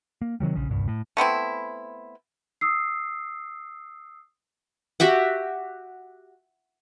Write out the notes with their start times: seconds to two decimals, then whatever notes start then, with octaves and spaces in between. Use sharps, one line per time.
0.22 A#3
0.40 C3 D#3 F#3 G3
0.56 A#1 C#3
0.68 D#1 C2 G2
0.88 A2
1.17 A3 B3 C4 E4
2.61 D#6 E6 C7
5.00 F#4 G4 E5 F#5